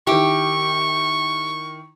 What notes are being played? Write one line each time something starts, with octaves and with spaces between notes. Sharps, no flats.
D#3 E4 G4 C#6